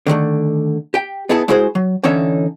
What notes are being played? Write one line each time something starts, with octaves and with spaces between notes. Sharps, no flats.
D3 D#3 F3 A3
G4 G5
B3 D#4 E4 G#4 A5
G#3 E4 F#4 G#4 C5
F#3
D3 E3 C#4 D#4 C#5 E5